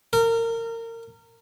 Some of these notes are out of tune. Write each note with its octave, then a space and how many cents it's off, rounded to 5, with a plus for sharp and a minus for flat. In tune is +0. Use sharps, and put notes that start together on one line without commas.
A#4 -25